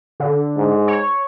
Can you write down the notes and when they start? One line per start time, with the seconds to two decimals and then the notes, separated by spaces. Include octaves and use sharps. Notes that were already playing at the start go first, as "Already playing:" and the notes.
0.20 D3
0.57 G#2
0.88 C#5